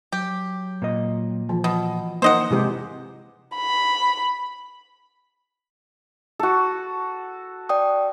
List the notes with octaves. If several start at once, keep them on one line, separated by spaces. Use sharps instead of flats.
F#3 G4
A#2 D#5
E3 F3
B2
A#3 D#4 C5 D#5 F#5
C3 E3 G#3 G4
B5
F#4 A4
D5 G5 D#6